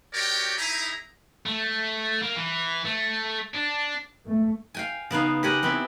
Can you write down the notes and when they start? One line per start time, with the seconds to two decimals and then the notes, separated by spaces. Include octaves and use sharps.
0.14 F#4 G4 A#4 C#5 D5 G5
0.58 D#4 E4 G#4 E5 A#5
1.46 A3
2.22 A#3
2.36 E3
2.85 A3
3.54 D4
4.26 A3
4.74 F5 G5 G#5
5.11 C#3 B3 D#4 F5
5.43 G4 A#4 C#5 F#5 G#5
5.63 B3 C4 E4